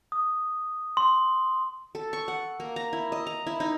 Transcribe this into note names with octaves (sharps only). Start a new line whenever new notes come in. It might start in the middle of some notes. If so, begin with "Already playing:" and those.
D#6
C6
A4
C#6
F#5
A#3
A#5
E4
D#5
A#5
E4
D#4